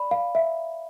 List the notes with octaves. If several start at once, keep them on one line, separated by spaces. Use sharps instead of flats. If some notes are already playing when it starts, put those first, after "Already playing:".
Already playing: D5 B5
F5
E5